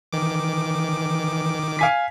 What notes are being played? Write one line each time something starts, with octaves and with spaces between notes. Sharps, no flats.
D#3 E3 D6
F5 G#5 B6